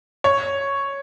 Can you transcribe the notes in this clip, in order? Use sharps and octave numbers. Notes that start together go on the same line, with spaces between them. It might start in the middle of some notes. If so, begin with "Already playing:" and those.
C#5